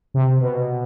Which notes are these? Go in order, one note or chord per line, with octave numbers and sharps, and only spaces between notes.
C3
B2